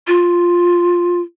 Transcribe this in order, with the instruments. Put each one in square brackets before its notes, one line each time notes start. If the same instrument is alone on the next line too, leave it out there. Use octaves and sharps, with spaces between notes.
[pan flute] F4